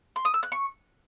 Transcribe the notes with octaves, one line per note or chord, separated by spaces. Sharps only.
C6
D#6
E6
F#6
C#6